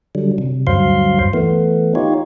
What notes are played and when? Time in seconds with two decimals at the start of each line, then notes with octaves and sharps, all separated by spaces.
0.15 D3 F#3 G3
0.38 C3
0.67 D2 G2 F#3 C5 F5 C6
1.33 E3 A3 B3
1.95 D#4 F4 G4 C#5